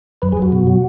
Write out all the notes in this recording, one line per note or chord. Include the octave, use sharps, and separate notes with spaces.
F#2 B4
G#4
F#2
F#4
B2
F#3